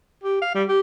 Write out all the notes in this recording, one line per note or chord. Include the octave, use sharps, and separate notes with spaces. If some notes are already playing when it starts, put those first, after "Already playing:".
G4
F5
G3
G4